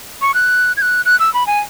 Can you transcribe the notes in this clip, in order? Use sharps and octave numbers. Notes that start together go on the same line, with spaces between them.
C#6
F#6
G#6
F#6
F#6
E6
B5
G#5